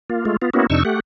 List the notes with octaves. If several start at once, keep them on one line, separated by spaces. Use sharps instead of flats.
A#3 F4
G#3 A3 F4
B3 F4
A#3 B3 C#4 E4 F#4
F2 C3 D4 D#4 C#6 E6
A3 G4 F#5